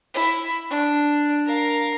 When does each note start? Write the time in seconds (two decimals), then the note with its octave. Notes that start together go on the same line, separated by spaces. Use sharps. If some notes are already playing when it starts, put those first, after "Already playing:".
0.14 E4
0.70 D4
1.46 A#4 F5